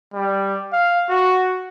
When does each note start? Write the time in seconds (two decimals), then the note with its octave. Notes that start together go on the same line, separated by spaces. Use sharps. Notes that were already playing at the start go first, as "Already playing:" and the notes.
0.14 G3
0.73 F5
1.09 F#4